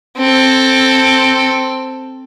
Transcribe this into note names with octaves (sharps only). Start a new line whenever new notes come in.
C4 A4